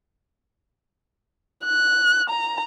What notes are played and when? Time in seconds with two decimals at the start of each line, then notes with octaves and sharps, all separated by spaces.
1.65 F#6
2.29 A#5